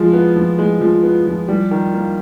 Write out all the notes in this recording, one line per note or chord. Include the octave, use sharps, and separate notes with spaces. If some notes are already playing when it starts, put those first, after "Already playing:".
Already playing: F3 G#3
B3
F3
G#3
F3
B3
F3
G3
D#3
A#3